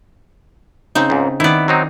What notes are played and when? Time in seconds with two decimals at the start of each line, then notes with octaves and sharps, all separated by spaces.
0.95 C#3 C4 D#4
1.10 C#2 G#2
1.40 D#3 B3 E4 D5
1.68 F#3 C4 D#4